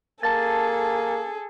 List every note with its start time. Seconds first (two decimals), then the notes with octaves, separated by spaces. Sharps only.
0.23 A#3 G#4 A4 A5 A6